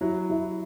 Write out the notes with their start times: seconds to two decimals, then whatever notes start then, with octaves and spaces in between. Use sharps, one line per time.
0.01 F#3 E4
0.30 E4